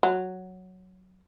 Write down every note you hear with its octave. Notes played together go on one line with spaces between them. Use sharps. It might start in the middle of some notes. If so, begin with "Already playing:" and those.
F#3